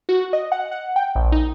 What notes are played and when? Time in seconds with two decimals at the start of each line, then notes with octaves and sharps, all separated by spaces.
0.09 F#4
0.33 D#5
0.52 F#5
0.71 F#5
0.96 G5
1.15 A#1
1.32 D#4